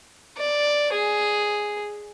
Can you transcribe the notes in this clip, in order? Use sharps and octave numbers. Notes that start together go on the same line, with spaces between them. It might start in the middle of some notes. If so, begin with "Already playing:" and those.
D5
G#4